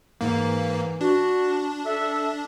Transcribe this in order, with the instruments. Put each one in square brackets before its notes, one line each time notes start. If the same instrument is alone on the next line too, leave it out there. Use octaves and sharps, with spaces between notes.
[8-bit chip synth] G#2 A#3 [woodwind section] E3
[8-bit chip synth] D4 [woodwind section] F#4
[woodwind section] A4 E5